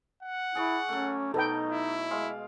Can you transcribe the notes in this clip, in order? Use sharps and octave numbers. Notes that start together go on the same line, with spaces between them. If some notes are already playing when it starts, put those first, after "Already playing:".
F#5
E4 G#4 D5 C#6
F#3 A3 C#4
B2 D#4 A4 B4 G5
E4
G#3 D5 F5